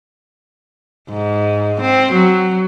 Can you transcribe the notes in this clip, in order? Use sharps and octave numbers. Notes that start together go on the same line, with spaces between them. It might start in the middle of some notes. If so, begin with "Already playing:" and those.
G#2
C4
F#3